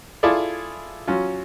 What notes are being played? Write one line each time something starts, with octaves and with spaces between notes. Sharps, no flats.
E4 F4 G#4 A4 D5
F#3 C#4 F4